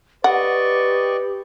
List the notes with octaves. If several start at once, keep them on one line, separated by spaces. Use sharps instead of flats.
G4 B4 D5 D#5 F#5 C#6